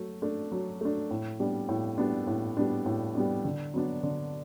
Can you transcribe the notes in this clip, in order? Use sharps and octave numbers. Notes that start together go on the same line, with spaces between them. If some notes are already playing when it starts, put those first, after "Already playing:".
Already playing: F#3 A3
A3 D4
F#3
A3 D4
A2
G3 B3 D4
A2
G3 B3 D4
A2
G3 B3 D4
A2
G3 B3 D4
D3
F#3 B3 D4
D3